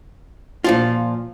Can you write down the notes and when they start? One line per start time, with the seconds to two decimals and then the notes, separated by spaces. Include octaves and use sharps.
0.64 A#2 F3 F4